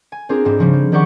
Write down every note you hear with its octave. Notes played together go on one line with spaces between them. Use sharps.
G#5
C4 D4 F4 G#4 A#4
G#2 G3 C4
C#3 F3 G3
C4
D#3 G3 G4 D5 F#5 C#6